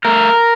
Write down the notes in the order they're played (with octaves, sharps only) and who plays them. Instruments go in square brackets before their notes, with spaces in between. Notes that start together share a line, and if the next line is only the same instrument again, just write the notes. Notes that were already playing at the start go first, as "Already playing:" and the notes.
[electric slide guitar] A3 A#4